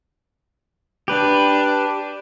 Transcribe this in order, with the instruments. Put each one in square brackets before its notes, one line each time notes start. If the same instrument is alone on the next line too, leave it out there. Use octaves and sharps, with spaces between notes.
[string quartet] D4 [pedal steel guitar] G4 B4